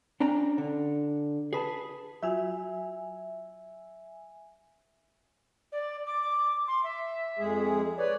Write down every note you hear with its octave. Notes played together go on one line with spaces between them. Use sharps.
C#4 D4 G5 A#5
D3
G#4 B4 A5
F#3 F4 F#4 E5 G#5
D5
D6
C6
E5
F2 G#3 G#4
B4 C#5 D5